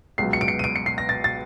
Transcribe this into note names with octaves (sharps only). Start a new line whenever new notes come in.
C#2 B2 F#3 C7
C#7
D7
C#7
D#7
D7
C#7
C7
A#6
A6
A6